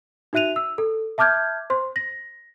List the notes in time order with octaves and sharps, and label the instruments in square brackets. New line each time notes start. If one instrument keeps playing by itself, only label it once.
[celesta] D#4 F#4 E5 F#6 D#7 F7
E6
A4
E5 A5 D6 F6 G6 G#6
C5 C6
A#6